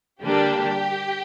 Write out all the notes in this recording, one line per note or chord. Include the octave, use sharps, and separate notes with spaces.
D3 G3 A#3 D4 G4